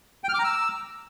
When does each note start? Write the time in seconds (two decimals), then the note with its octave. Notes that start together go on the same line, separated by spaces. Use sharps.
0.24 G5
0.29 F6
0.34 D6
0.39 A#5
0.44 E6